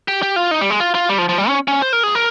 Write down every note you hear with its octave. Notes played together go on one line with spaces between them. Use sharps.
G4
G4
F4
D#4
G3
G#3
F4
F4
G3
F3
F3
G3
C#4
C#4
C5
A#4
G#4
A#4